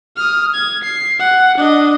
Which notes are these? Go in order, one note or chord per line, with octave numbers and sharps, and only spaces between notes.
D#6 F6
G#6
C7
F#5
D4 D#5